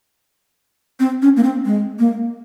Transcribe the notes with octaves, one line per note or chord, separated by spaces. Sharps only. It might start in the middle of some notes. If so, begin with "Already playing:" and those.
C4
C#4
A#3
C4
G#3
A#3